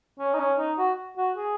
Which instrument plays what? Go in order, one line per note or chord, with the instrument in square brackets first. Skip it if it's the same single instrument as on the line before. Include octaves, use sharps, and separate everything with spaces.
[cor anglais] C#4
D#4
C#4
D#4
F#4
F#4
G#4